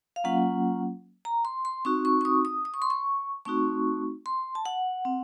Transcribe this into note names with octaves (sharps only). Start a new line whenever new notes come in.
F5
F#3 A#3 C#4 F4 F#5
A#5
C6
C6
C4 D#4 F#4 C#6
C#6
C#6
D#6
D#6
D#6
C#6
C6
C#6
A3 C4 D#4 F#4 C#6
C6
A5
F#5
C4